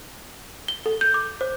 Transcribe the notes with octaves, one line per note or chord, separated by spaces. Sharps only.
G7
A4
G6
D6
C5